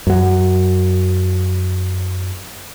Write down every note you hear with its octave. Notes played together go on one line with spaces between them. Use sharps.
F#2 F#3